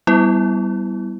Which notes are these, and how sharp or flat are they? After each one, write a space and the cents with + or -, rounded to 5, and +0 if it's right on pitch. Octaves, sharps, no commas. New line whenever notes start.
G3 -15 B3 +0 E4 +0